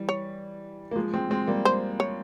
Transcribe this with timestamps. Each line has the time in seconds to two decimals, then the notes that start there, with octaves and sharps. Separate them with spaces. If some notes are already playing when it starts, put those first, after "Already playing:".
Already playing: E3 G3
0.09 C#5
0.91 A#3
0.96 F3 G#3
1.13 G#3 C4
1.30 G#3 C4
1.47 G3 A#3
1.65 C5
2.00 C#5